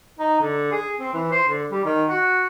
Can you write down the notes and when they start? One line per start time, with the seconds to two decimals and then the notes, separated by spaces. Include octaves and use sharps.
0.19 D#4
0.40 D3
0.72 G#4
1.00 C4
1.13 E3
1.31 C5
1.49 D3
1.71 G3
1.85 D#3
2.09 F#4